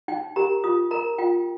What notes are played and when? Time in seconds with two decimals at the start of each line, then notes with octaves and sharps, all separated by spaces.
0.08 D#4 G5
0.36 G4 A#4 A#5
0.64 F4 D#6
0.91 A#4 A#5
1.18 F4 G5